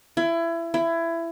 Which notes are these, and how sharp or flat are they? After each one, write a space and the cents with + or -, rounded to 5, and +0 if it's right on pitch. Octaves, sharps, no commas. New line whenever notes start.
E4 +25
E4 +20